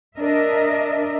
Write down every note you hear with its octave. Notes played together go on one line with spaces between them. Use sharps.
D4 A#4 D#5 E5